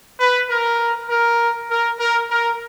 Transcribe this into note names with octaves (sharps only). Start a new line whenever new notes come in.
B4
A#4
A#4
A#4
A#4
A#4